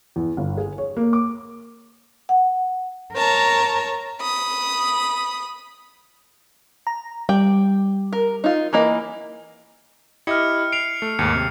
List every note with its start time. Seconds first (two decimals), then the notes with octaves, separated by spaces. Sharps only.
0.16 E2
0.37 G1
0.58 G#4
0.78 C#5
0.97 A#3
1.13 D6
2.29 F#5
3.14 A#4 C#5 A5 A#5
4.20 B5 D#6
6.87 A#5
7.29 G3 G5
8.13 A#4
8.44 D#4 F4
8.73 E3 A#3 D#5
10.27 E4 G4 D#5 F6 C#7
10.72 C7 D7 F7
11.02 A3
11.19 D#2 G#2 C#7
11.35 C3